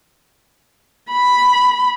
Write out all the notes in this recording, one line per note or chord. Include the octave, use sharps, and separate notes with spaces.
B5